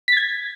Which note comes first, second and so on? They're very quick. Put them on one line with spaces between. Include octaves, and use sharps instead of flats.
B6 A6 G#6